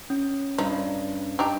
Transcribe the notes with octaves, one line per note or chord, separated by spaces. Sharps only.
C#4
G2 F3 D#4
D4 D#4 G4